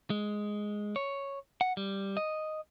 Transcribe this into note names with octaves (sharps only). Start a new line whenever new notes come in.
G#3
C#5
F#5
G3
D#5